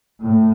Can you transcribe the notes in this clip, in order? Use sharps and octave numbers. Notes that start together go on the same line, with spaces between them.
A2